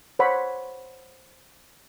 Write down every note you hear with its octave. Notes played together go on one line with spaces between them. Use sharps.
C5 C#5 F#5 B5